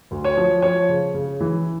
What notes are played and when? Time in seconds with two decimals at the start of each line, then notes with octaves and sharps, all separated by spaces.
0.11 D2
0.24 C#5
0.37 F3
0.62 F3 C#5
0.89 C#3
1.14 C#3
1.40 E3